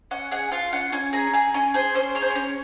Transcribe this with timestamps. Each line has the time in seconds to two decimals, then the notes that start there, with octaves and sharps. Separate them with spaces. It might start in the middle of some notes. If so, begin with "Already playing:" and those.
0.11 C#4 F#5
0.31 G#4 F#5
0.52 F4 F5
0.72 C#4 F#5
0.92 C#4 G#5
1.13 G#4 A#5
1.33 G#4 G#5
1.54 C#4 G#5
1.74 G#4 C5
1.95 C#4 C5
2.15 G#4 C#5
2.22 C5
2.30 C#5
2.35 C#4